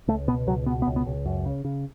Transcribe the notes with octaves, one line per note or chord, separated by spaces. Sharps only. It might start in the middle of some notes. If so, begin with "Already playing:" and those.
C#2 A3
B2 B3
C#2 F#3
B2 B3
B3
C#2
B3
C#2
F#2
C#3
C#3